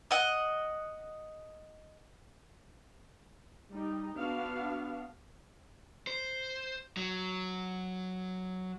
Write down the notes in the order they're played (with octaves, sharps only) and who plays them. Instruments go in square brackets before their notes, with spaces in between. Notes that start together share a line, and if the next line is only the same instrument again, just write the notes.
[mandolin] D#5 F#5
[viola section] G3 D#4
B3 D4 F#4 F5
[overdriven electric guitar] C5
F#3